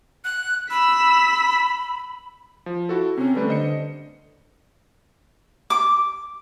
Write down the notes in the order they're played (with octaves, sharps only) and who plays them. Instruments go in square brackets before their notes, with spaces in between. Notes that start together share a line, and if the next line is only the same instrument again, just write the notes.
[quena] F#6
[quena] B5 [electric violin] E6 B6
[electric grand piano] F3
E4 F#4 A4
[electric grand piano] C3 C#4 [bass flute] C4
[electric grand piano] D3 G3 A3 [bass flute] B4
[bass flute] D3 [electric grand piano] C5 D#5 C#7
[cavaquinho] D6